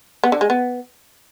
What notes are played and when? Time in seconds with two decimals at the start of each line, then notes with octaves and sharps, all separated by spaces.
0.24 B3
0.32 D3
0.41 G#3
0.50 B3